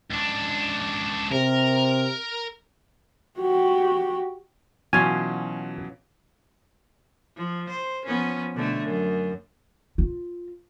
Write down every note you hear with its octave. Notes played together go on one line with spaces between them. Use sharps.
C#2 D4
C3 A#4
F#4 G4
B2 E3 F#3 C#4 F4 G#5
F3
C5
F3 B3 C#4
B2 D3 A3
F#2
F4